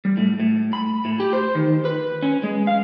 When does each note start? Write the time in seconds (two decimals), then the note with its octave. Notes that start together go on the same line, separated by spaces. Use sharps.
0.05 G3
0.17 A2
0.40 A2
0.73 B5
1.05 A2
1.20 G4
1.33 C5
1.55 D#3
1.85 B4
2.22 C#4
2.43 G#3
2.67 F5